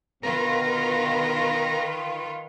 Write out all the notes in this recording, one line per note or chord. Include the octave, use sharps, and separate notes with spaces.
B2 D3 D#3 B3 F4 A#4 B4